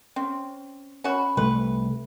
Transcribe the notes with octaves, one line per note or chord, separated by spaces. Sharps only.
C4 C#4 G5
C#4 F#4 A#4 B5
C2 A3 B4